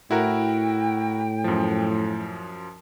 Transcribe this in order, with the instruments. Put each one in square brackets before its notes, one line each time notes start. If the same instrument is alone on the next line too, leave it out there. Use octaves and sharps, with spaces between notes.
[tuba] A2 [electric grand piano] E4 F#4 A#4 [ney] G5
[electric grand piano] F#2 F3